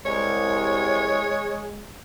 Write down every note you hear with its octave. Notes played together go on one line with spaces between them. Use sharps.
C2 G#3 C#5